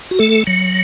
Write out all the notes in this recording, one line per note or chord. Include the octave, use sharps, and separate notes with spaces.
F#4
A3 A4
F#3